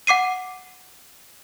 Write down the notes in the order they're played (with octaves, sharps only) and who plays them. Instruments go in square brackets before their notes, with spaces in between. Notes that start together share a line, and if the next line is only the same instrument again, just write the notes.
[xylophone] F#5 D6 C7 D#7